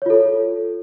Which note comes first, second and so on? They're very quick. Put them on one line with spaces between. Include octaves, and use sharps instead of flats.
C#5 F4 A4